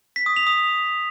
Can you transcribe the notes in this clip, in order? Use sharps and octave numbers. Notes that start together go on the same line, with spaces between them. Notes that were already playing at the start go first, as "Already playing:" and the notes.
B6
D#6
F7
D#6